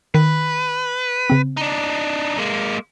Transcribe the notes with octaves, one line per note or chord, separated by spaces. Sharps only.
D#3 B4
C#3 C4
D4 D#4
G#3 A#3